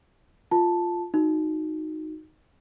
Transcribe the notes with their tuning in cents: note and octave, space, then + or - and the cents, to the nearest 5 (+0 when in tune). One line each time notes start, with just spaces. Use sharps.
F4 +0 A5 +0
D#4 +0 F#4 -15